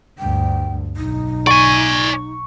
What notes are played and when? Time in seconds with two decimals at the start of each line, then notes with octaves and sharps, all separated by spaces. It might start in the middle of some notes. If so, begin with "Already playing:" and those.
0.19 D2 G2 G5
0.97 B1 D#4
1.47 D5 G#5 C#6